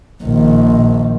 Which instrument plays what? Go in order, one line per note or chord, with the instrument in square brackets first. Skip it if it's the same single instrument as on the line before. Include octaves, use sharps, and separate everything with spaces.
[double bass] A#1 D#3